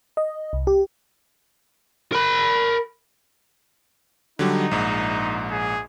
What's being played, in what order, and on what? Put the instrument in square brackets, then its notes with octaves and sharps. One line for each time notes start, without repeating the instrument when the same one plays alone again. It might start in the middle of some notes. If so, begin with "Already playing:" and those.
[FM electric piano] D#5
C2
G4
[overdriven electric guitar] A#4 B5
[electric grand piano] D3 F#3 G3 [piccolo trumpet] D#4
[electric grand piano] A#1 G#2
[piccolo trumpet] G#4